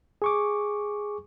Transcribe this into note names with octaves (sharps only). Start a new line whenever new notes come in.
G#4 C#6 D6